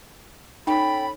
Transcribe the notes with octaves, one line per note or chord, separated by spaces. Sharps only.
C#4 D#4 A4 G5 B5